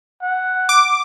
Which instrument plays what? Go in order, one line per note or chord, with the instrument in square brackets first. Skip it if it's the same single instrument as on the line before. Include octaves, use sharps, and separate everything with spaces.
[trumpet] F#5
[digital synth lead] D6